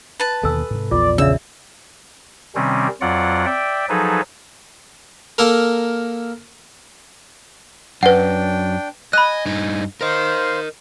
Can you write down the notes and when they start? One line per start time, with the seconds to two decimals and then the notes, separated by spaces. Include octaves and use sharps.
0.20 B4 A5
0.43 D#2 B2 D3 A4 G#5 E6
0.71 G#2 C3
0.91 A#1 E2 B3 F4 D5
1.18 C#3 D4 D5 E5 E6
2.55 C3 D#3 G3 C4 C#4
3.01 F2 F#3 F4 D5 F#5
3.46 D5 E5 G5
3.89 F3 F#3 D#4 G#4 A4 B4
5.38 A#3 A4 A#4
8.03 F#2 D4 B4 F#5 G5
9.13 D#5 G#5 B5 F#6
9.46 G2 D#4
10.01 A#4 C5 D#5 F5